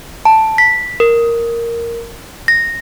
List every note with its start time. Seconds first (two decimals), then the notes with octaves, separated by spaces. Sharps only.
0.25 A5
0.58 B6
1.00 A#4
2.48 A#6